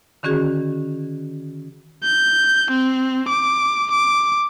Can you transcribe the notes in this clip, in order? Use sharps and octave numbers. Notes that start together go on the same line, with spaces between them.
D3 D#3 C#4 F#4 G#4
G6
C4
D6
D6